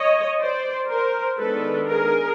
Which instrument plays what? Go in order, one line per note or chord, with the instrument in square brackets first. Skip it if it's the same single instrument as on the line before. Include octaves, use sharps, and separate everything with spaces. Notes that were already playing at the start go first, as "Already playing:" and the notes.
Already playing: [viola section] C#5 D#5
C5 D5
A#4 C5
D#3 G#3 B3 D4 A4 B4
G#4 A#4